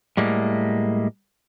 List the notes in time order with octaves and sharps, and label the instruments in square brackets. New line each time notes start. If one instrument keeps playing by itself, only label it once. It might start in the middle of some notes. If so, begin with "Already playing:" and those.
[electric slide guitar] A2 G3 G#3 A#3